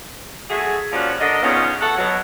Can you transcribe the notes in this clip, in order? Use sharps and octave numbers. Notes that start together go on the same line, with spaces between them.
F#3 A3 G#4
F3 G3 A#3 C#4 F#4
D3 A#4 D#5
A#2 C#3 B3 C#4 D#4
A4 C#5 F#5
B2 F#3